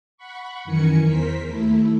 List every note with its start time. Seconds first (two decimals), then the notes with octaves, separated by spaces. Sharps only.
0.17 F#5 B5 C#6
0.65 F#2 D#3 E3 A#4 G#5 C#7
1.05 E2 A#4 C5 B6
1.45 D#2 A3 E4